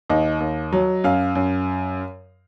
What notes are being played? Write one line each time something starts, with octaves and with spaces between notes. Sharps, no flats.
D#2 D#5
D#2
F#3
F#2 F5
F#2